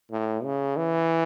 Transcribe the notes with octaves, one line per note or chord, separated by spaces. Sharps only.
A2
C#3
E3